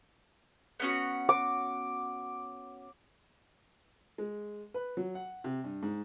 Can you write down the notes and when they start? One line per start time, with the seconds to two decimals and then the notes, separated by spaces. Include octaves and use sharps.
0.80 B3 C#4 F#4
1.29 D6
4.18 G#3
4.74 B4
4.97 F#3
5.15 F#5
5.44 C3
5.64 G2
5.83 G#2